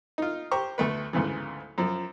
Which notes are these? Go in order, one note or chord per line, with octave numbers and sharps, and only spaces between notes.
D#4 F4
G4 C5 A#5 C#6
D2 A3 B4
D2 G#2 C#3 E3
F#2 F3